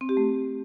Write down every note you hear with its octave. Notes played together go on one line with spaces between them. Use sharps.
C4
G4
A3